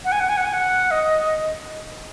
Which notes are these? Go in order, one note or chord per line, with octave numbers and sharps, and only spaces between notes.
F#5
G#5
F#5
G#5
F#5
G#5
F#5
D#5